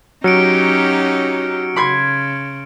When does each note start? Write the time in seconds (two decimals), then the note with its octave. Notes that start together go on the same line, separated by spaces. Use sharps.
0.24 F#3 C#4 D#4 G4 F6 C#7 D7
1.76 C#3 B5 C6 G#6